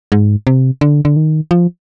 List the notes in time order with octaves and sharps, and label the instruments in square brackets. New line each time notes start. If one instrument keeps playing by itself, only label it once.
[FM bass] G#2
C3
D3
D3
D#3
F3